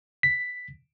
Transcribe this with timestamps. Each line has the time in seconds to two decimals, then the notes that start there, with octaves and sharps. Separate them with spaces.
0.23 B6